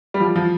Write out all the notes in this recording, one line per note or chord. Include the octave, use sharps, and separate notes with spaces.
G3
F3
F3